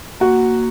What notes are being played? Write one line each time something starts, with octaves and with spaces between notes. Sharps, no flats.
A#3 F#4